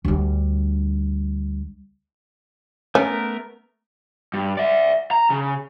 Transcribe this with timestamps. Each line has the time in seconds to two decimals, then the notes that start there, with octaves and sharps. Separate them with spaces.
0.05 D2 G3
2.95 A3 B3 C#4 A#4
4.34 G2
4.57 D5 E5
5.11 A#5
5.30 C#3